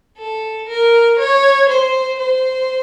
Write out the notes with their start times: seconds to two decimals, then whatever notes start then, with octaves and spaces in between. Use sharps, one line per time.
0.18 A4
0.68 A#4
1.18 C#5
1.68 C5
2.19 C5